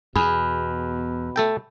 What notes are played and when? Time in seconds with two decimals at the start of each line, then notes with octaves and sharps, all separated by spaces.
0.16 E2 B2 G#4 B5
1.36 A3 A4 G5